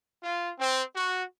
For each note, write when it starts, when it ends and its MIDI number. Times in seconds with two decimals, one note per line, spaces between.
0.22 0.52 65
0.58 0.83 60
0.95 1.24 66